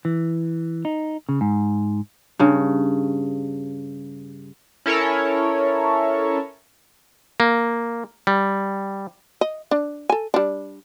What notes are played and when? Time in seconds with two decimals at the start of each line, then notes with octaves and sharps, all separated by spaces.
0.05 E3
0.85 D#4
1.29 C#3
1.41 G#2
2.39 G2 C#3
4.86 C#4 E4 A4 A#4 C#5
7.40 A#3
8.27 G3
9.41 D#5
9.71 D4
10.10 A4 G#5
10.34 G3 D4